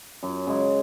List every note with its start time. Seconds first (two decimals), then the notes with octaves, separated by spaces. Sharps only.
0.23 F#2
0.47 C#3 G#3